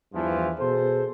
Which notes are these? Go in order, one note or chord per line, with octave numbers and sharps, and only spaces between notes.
E2 G2 E3 F3
B2 G#4 A4 C5